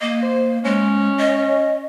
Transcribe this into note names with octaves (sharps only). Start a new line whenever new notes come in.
A#3 D#5
C5
G#3 C#4
D#5